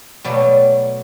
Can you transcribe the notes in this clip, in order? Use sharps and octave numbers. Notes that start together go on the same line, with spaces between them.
B2 F#3 A3 D5